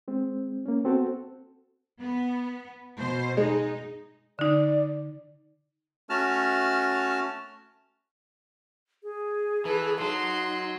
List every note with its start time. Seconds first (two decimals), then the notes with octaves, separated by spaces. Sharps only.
0.08 G#3 C4
0.66 A#3 C#4
0.84 B3 C4 F#4 A4
2.01 B3
2.98 B2 C5
3.37 G#3 D#4
4.39 D3 D#4 D5
6.10 A3 C#4 F#4 A5 F6
9.03 G#4
9.65 E3 A4 B4
10.01 F#3 D#4 C6